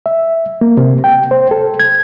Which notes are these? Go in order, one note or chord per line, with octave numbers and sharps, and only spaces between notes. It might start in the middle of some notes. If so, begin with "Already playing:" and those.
E5
A#3
C3
G5
C5
A4
G#6